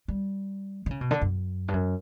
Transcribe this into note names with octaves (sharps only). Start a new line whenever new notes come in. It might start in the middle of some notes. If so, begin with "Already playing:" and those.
G3
D3
C#3
B2
D3
F#2
G2
F#2